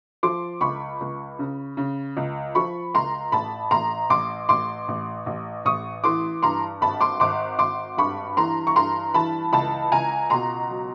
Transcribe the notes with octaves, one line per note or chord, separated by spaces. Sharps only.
F3 C6 D6
C#2 B5 C#6
C#2
C#3
C#3
C#2
F3 B5 C#6
C#2 A#5 C6
A1 A5 B5
A1 A#5 C6
A1 C6 D6
A1 C6 D6
A1
A1
A1 C#6 D#6
E3 C6 D6
G2 A#5 C6
G#1 A5 B5
C6 D6
G#1 C6 D6
G#1 C6 D6
G2 B5 C#6
E3 A#5 C6
C#6
G2 A#5 C6
E3 A5 B5
C#2 A5 B5
C#2 G#5 A#5
B2 A#5 C6
F#3